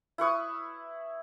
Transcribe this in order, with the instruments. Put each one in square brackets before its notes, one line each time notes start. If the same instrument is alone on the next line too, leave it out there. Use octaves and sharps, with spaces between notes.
[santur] E4 B4 C#6 D#6